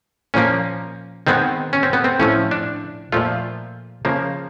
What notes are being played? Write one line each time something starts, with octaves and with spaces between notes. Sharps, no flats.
A#2 F3 A#3 C#4
D#3 G#3 B3 C4
C#4
C4
B3
C4
A2 F3 A3 C#4
D4
A#2 F3 A3 F4
C#3 F3 A#3